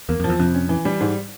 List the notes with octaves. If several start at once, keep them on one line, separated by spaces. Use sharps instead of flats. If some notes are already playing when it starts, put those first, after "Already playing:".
E2 A#3
F2
F3
E2
F2 C3
C#4
E3
G3
G#2